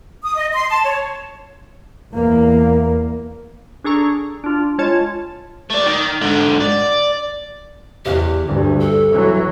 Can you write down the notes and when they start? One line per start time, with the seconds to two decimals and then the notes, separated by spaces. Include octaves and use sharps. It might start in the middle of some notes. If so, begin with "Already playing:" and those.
0.23 D#6
0.35 D#5
0.54 C6
0.69 A5
0.83 C#5
2.11 E2 A#3
3.84 D4 G#4 A4 A#5 C#6
4.44 D4 F4
4.78 G#3 F4 C#5 A5 G#6 A6
5.70 A3 D5
5.86 D#3
6.21 G#2 D3
6.60 D5
8.05 E2 G4
8.46 D2 G2
8.81 A4
9.11 E3 F#3